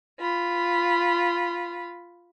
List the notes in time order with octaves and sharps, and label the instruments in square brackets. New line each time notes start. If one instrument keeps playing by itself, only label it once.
[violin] F4 B5